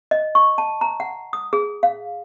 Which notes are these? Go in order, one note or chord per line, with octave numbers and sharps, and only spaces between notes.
D#5
C#6
A5
A#5
F#5
D#6
G#4
F5